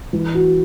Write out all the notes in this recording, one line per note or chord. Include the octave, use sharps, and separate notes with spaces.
E3
F#4